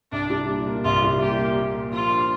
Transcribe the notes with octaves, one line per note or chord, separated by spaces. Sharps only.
C2 D4
G3
A#2
A#3
C2 F4
G3
A#2 G4
A#3
A#2
A#3
F3 F4
D4